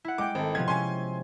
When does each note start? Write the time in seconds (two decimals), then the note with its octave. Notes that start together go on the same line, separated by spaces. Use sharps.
0.04 E4 F#5
0.18 G#3 G5 D6
0.35 G#1 A4
0.55 C3 F3 B3 G#6
0.68 C3 C#4 G#5 C6